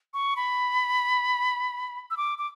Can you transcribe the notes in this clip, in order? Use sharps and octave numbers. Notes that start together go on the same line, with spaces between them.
C#6
B5
E6
D6
D6